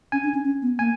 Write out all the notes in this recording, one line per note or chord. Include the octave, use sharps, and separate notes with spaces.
C#4 G#5
D4
C#4
C#4
B3
A#3 G#5